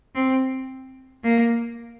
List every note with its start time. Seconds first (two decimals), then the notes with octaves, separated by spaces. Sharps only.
0.15 C4
1.23 A#3